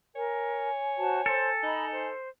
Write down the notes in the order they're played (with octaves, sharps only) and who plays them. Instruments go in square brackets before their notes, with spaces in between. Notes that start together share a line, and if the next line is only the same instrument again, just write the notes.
[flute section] A#4 [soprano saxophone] C#5 [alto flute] G#5
[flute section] F#4 C5 A5
[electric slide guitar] A4 [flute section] C5 C6
[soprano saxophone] D#4 [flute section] D#5 A#5 B5
[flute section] C5